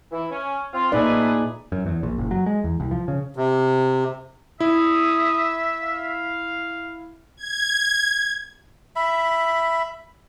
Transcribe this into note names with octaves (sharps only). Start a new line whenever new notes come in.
E3 E4
C#4
C4 F4
A#2 A3 D#4 G#4 B4 D5
F#2
E2
A#1
F#1
F#3
G#3
E2
C2
F3
C#3
C3
E4 E5 D#6
F5
G#6
E5 B5